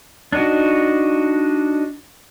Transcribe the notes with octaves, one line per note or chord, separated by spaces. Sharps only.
D4 D#4 F#4